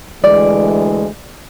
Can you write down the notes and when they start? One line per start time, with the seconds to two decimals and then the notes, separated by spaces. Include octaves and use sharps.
0.24 D2 E3 G#3 D5